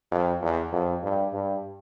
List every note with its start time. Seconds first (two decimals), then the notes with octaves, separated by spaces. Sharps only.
0.11 F2
0.42 E2
0.73 F2
1.03 G2
1.33 G2